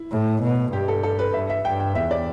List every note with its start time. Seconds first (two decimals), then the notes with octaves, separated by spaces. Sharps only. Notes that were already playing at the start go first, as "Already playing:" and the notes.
Already playing: E4
0.11 A2
0.42 B2
0.73 G2 G4
0.88 A4
1.03 A4
1.19 B4
1.33 G2 E5
1.50 E5
1.64 G2 G5
1.80 G5
1.95 E2 E5
2.11 D5